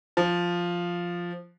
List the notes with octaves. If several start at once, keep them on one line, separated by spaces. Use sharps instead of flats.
F3